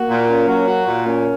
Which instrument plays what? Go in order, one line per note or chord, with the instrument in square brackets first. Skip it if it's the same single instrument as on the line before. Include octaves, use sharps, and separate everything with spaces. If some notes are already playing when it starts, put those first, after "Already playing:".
Already playing: [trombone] A#3 [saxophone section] F#4
[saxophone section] A#2
C#4
F#3
F#4
A#2
[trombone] A#3 [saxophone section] C#4